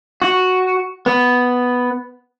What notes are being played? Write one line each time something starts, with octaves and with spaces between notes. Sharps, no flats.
F#4
B3